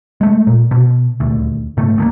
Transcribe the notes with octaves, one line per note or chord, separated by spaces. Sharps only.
G#3 A3
A#2
B2
D#1 D2
G#2 C#3 A3
D2 A3 A#3